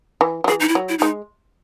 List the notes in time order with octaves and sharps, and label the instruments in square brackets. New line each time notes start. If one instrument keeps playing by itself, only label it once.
[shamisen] E3
F#3
[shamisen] E3 [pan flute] G#4
[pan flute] D#4
E4
[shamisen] F#3
[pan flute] E4
[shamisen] G#3 [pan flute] D#4